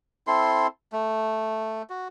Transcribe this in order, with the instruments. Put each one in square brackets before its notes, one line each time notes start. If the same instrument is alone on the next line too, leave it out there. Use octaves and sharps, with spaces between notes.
[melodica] C4 E4 A4 C6
A3
F#4